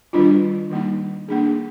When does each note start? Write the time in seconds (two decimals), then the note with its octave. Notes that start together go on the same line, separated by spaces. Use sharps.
0.13 D#3 G3 D4 F4
0.70 D#3 G3 A#3 D#4
1.28 A#3 D4 G#4